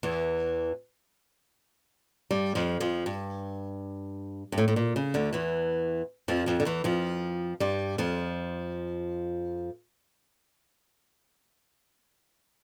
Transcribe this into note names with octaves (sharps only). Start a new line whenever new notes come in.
E2 E3
G2 G3
F2 F3
F2 F3
G2
G2
A2
A2
A#2
C#3
D2 D3
E2 E3
F2 F3
F2 F3
D3
E2 E3
F2 F3
G2 G3
F2 F3